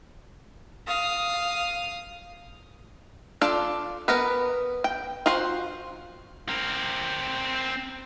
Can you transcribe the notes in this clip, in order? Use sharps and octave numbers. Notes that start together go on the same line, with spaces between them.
F5 D#6
D4 F4 A4 D5
B3 A#4 B4
G5
F4 F#4 C5
C4 A#4